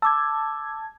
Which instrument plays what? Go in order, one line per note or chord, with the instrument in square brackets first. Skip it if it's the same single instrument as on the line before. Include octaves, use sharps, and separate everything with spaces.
[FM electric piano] A5 G#6 [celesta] D6 E6